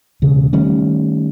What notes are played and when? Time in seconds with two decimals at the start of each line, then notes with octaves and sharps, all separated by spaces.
0.22 E1 C#3
0.53 D#3 G3 A3 C#4